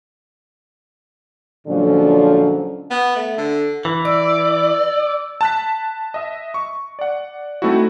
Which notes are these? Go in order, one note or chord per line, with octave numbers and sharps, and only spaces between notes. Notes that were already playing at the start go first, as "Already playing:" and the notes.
A#2 D3 F3 F#3 G#3 C#4
B3
A3
D3
E3
D5 E6
A5 F#6 B6
D#5 E5
C#6
D5 F#5
A3 C4 D#4 E4 F#4